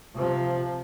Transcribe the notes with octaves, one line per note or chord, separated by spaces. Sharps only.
C3 F3